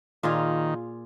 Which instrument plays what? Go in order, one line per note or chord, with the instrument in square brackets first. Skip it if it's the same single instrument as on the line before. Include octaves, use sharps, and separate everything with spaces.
[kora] A#2 F4 G#4 [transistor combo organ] D#3